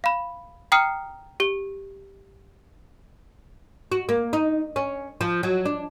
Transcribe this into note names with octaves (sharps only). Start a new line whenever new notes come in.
F5 B5
G5 A#5 D#6 F6 C7 C#7
G4 G7
F#4
A#3
D#4
C#4
F3
F#3
D4